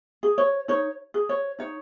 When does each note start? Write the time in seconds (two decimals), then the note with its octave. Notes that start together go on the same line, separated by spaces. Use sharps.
0.23 G#4
0.38 C#5
0.68 D#4 C#5
1.14 G#4
1.29 C#5
1.59 D#4 C#5